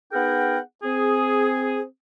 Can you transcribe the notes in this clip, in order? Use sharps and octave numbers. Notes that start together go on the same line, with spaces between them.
B3 D#4 G#4 A#4 F#5 G5
C4 G#4